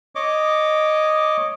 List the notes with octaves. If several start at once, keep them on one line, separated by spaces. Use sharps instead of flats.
C#5 D#5 D6